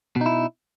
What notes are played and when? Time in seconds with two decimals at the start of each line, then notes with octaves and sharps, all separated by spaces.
0.16 B2
0.21 D#4
0.26 E4